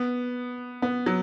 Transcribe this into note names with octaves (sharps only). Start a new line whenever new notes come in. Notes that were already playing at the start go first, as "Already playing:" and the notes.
Already playing: B3
B3
F#3